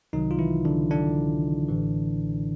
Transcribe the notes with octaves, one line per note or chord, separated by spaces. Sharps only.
C2 C3 D#3 F#3 D#4
F4
E3 E4
D3 D4
D3 D4
A1 A2 E3